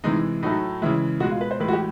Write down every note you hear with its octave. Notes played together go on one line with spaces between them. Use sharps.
C3 E3 G#3 D#4
A2 F#3 A3 D#4
C#3 E3 G#3 E4
B2 G#3 F#4
F4
B4
C5
A2 E3 G#3 B4
F#4
G4